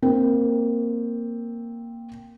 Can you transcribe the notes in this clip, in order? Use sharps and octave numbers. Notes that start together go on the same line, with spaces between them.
A#3 C4